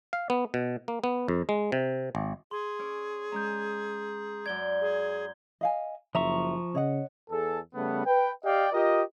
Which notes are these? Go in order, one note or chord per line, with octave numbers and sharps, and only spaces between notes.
F5
B3
B2
A#3
B3
F2
G#3
C3
G#1
G#4 C6
C#4 C#5 D6
G#3 C#4 A#5 G6
F#2 D5 G#6 G7
G#4
D#5 F5 G#5
F#1 F3 E5 A#5 C#6
C#3 C#5 D#5 F#5
E2 G#4 A4
C#3 G3 A3 B3
B4 G5
G4 D5 D#5 F5 G5
F4 G4 A#4 D#5